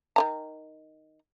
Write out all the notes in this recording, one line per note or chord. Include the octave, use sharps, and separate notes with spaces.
D#3 E3 A#5